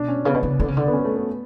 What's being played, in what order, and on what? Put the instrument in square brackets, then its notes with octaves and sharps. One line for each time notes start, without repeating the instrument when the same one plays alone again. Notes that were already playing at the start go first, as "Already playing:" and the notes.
Already playing: [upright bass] B2 [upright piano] D4
[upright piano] C#4
[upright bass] C#3 [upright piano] B3
[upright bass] B2
C#3
D3
C#3
D3
[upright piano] B3
C#4
A3
B3